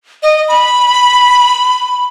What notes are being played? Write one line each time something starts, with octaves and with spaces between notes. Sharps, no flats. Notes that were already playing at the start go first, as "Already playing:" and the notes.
D#5
B5